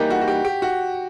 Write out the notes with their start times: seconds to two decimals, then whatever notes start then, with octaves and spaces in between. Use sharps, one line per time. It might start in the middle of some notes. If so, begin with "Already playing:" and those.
Already playing: E3 G3 A#3 D#4 G4
0.10 F#4
0.21 F#4
0.28 G4
0.45 G4
0.62 F#4